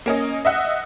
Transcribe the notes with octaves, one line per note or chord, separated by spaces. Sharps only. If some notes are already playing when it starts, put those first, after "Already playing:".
A#3 C#4 D#5
D#5 E5 F#5